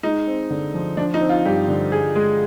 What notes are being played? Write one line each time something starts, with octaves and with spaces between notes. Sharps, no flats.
G#3 D#4
C4
D3
F3
F3 D4
D#4
C4
F4
G2 G4
D3
G#4
G#3